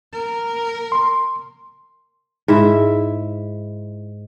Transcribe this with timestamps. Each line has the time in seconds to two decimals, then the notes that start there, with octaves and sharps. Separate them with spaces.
0.13 A#4
0.92 C6
2.48 G#2 E4 E5